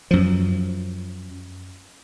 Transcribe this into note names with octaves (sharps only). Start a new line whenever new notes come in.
F#2 F3